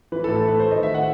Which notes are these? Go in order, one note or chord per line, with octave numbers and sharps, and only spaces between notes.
E3 B4
A4
A2
A4
A3 B4
A3 C5
D#5
D#3
E5
D#3 F#5